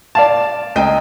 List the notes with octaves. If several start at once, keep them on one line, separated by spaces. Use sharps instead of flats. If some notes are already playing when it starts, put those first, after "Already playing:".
D5 F5 A5
C#2 D#5 G5